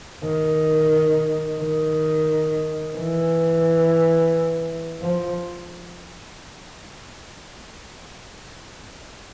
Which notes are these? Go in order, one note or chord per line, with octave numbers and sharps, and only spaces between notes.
D#3
D#3
E3
F3